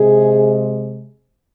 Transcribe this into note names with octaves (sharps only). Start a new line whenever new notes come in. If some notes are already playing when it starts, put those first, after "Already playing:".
Already playing: C3 G#3 G#4